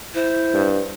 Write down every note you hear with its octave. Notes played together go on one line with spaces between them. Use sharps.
E4 C5
G2